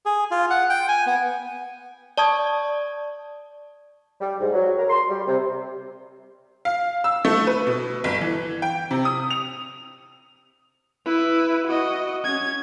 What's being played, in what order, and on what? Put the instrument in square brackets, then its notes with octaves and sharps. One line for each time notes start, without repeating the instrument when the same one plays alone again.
[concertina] G#4
F4
F#5
G5
G#5
B3
[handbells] D5 A5 C#6 D#6 G#6
[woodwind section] G3
G#2
F#3
A#4
C6
G3
C3
[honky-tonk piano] F5
E6
A3
B4
B2
G1
E3
G5
C3
D#6
F7
[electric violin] E4 B4
F#4 D#5
C#4 G#6